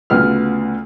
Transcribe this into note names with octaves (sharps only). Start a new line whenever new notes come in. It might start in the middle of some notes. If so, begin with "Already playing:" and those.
D2 C#3 B3 F4 F6